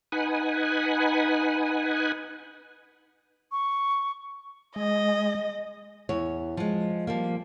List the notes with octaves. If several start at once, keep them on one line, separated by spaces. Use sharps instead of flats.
D#4 B4 F#5 G#5
C#6
G#3 D#5
E2 C#5
F3 G#3
F3 G3 A#3